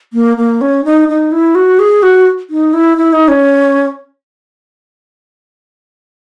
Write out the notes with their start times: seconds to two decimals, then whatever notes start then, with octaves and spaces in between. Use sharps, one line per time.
0.13 A#3
0.37 A#3
0.61 C#4
0.84 D#4
1.09 D#4
1.32 E4
1.55 F#4
1.79 G#4
2.03 F#4
2.50 D#4
2.74 E4
2.97 E4
3.13 D#4
3.28 C#4